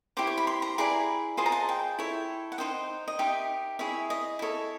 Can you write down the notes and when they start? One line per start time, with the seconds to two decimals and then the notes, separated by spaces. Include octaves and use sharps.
0.17 E4 G4 C5 D6
0.27 C#6
0.38 B5
0.47 C6
0.62 A#5
0.78 E4 G#4 B4 D5 A#5
1.37 F4 G#4 C5 D#5 A5
1.46 A#5
1.52 A5
1.69 G5
1.99 E4 A4 C#5
2.52 F#5
2.58 D#4 G#4 C5 D#5 G5
3.08 D#5
3.19 D#4 G4 A#4 E5
3.79 E4 G#4 C#5 E5
4.10 D#5
4.39 E4 A4 C#5